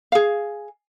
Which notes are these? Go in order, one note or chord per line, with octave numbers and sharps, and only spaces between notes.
G#4 F5